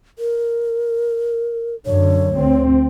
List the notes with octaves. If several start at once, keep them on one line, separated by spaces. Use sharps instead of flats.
A#4
F#2 D3 C#5
D2 C4